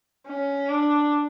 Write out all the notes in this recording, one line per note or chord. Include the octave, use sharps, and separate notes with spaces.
C#4
D4